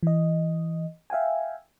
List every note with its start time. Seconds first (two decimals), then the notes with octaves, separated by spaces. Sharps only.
0.03 E3 D#5
1.10 E5 F5 G5 G#5